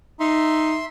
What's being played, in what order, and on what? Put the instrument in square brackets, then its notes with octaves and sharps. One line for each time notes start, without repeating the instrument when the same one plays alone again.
[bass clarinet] D#4 [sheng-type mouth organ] E5 C6